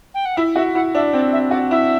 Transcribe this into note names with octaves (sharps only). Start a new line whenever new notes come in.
G5
F#5
E4 E5
F#4 E5
E4 F#5
D4 E5
C4 D5
E5
F#4 D5
E4 E5